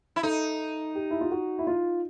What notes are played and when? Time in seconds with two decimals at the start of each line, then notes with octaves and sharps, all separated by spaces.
0.16 E4
0.23 D#4 A4
0.95 G4
1.11 E4
1.21 F4
1.31 F#4
1.59 E4
1.67 F4